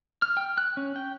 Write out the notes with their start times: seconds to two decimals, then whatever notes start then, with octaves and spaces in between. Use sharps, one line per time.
0.22 F6
0.37 G5
0.58 F#6
0.77 C#4
0.96 G5